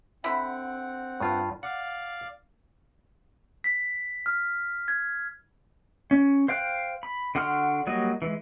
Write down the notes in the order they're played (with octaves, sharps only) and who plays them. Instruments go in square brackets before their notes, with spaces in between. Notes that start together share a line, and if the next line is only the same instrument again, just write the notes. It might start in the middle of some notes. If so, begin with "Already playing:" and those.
[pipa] D3 E4 B5 [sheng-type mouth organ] C4 F#5
[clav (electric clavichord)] G2 F4
[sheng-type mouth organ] D5 F5 [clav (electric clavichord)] F#5
[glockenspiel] B6
F6
G#6
[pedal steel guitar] C#4
C5 F5 G5 F#6
B5
D3 F#4 F#5 C6 F6
F#3 G3 A#3 F#4 D#5
E3 G#3